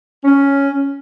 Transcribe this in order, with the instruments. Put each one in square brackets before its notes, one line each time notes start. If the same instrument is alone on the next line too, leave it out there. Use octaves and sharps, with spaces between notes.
[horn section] C#4